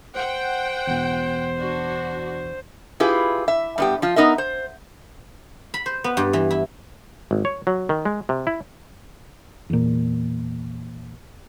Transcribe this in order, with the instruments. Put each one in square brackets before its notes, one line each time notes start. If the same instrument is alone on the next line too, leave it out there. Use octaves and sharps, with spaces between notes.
[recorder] C5 [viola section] F#5 G5
[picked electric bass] E2 B2
[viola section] D4 F#4
[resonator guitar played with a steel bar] E4 F4 G4 G#4 B4
E5
G2 B3 G4
F3 F4
B3 D#4 A#4 E5
C5
[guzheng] B5
C5
B3
G2
E3
E4
[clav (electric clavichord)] G#1
C#5
F#3
D#3
G#3
C3
E4
[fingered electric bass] E2 A#2